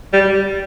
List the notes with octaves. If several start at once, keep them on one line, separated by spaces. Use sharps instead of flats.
G3